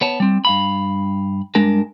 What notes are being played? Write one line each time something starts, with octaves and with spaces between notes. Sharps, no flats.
B3 C#5 A5
G3 C4
G2 F5 B5
G2 G#3 D4 A#4 A5